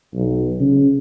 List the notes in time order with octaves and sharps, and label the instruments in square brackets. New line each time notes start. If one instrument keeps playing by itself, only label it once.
[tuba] B1
C#3